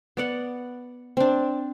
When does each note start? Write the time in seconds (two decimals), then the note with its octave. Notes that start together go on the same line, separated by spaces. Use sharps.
0.17 B3 D5 F#5
1.17 C4 D4